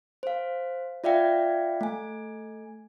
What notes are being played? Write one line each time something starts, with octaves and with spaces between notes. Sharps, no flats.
C5 F5
F4 D5 E5 F5 G5
A3 G#5